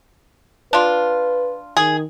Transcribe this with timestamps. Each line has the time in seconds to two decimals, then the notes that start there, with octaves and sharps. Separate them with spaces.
0.73 D4 F4 B4
1.77 D#3 G#4